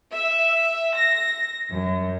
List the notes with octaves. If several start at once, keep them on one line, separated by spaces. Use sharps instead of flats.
E5
A#6
F#2